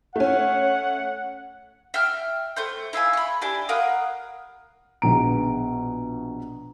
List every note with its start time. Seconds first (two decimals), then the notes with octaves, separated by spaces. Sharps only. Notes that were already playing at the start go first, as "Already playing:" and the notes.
0.16 A3 C#4 F#5
1.94 E5 G5 F6
2.56 A3 C5 G6
2.93 E4 E5 F5 G#5
3.13 B5 C#6
3.41 D4 E4 G4 G#5
3.69 A#4 F5 F#5 D#6
5.02 A#1 B2 A#5 D7